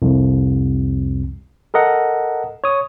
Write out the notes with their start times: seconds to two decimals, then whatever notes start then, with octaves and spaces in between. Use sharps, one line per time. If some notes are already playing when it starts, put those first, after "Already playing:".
0.02 C2 F2
1.74 A4 A#4 D#5 F#5
2.64 C#5 D#6